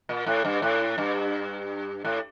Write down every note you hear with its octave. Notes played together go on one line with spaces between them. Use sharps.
A#2
A2
G2
A2
G2
A2